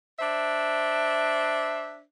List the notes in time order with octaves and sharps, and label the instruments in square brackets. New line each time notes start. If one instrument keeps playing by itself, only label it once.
[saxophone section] D4 C5 E5